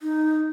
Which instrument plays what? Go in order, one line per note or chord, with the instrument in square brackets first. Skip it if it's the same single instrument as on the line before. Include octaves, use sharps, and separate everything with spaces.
[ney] D#4